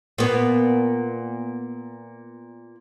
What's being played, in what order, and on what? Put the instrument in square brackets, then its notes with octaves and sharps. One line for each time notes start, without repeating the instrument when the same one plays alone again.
[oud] A#2 B3